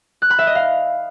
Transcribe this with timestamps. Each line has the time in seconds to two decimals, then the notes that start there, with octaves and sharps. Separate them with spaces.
0.22 F#6
0.30 B5
0.39 E5
0.47 D#5
0.55 F5